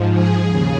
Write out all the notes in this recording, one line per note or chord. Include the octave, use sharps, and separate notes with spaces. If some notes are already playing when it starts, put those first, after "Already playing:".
Already playing: G#2 F3
G#4
D#2 C#3